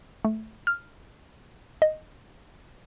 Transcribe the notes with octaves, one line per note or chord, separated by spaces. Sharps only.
A3
F6
D#5